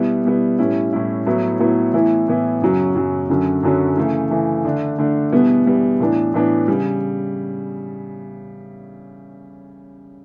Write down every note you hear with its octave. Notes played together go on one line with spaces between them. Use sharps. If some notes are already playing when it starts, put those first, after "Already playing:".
Already playing: B2 G3 B3 E4
B2 G3 B3 E4
A2 G3 C#4 E4
A2 G3 C#4 E4
A2 F#3 B3 E4
A2 F#3 B3 E4
A2 E3 B3 E4
A2 E3 B3 E4
F#2 C#3 F#3 C#4
F#2 C#3 F#3 C#4
F#2 D3 F#3 C#4
F#2 D3 F#3 C#4
C#3 E3 A3
C#3 E3 A3
D3 A3 D4
D3 A3 D4
E2 B2 G3 B3 E4
E2 B2 G3 B3 E4
A2 E3 B3 D4
A2 E3 B3 D4
C#3 G3